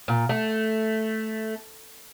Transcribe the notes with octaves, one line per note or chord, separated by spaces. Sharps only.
A#2
A3